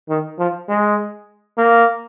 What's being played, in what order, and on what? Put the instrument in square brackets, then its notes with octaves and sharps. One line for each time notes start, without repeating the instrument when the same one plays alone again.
[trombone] D#3
F3
G#3
A#3